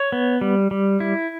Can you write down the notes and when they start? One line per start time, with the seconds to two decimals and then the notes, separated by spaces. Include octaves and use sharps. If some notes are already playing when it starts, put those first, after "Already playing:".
Already playing: C#5
0.12 B3
0.41 G3
0.71 G3
1.00 E4